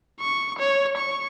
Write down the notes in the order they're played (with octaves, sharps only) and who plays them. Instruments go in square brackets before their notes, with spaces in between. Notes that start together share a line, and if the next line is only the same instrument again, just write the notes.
[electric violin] C#6
C#5
C#6